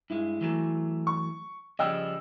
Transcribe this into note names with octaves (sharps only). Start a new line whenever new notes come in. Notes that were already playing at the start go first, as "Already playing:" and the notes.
G2 G#3 E4
E3 F#3 A3
C#6
C#3 F3 G3 D#5 G5 E6